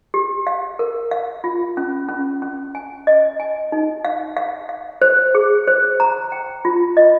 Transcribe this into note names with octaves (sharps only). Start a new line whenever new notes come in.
G4
F5
A#4
F5
F4
C#4
C#4
C#4
G#5
D#5
G#5
D#4
F5
F5
F5
C5
G#4
C5
A#5
G5
F4
D#5